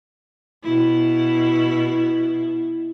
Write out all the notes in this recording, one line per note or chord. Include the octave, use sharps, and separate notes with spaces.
B2 E4